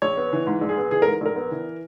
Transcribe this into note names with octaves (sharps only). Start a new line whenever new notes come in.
A#1 C#5
B3
E3
G#2
A#1
G#4
B3
E3 G#4
G#2 A#4
A#1 A#4
B3
E3